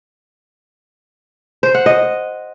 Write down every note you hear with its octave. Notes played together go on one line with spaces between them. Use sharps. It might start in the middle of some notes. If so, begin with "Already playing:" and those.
C5
F#5
D#5